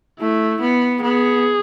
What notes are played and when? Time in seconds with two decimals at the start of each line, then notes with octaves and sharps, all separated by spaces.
0.20 A3 E4
0.61 B3
1.02 B3 G#4